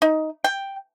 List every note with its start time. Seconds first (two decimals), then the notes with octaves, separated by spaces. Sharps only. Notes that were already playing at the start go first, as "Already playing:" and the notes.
0.02 D#4
0.44 G5